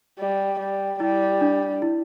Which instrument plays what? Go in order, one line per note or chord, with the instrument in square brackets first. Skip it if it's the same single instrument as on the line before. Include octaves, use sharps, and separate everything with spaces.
[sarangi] G3
G3
[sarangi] G3 [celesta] E4
[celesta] D4
E4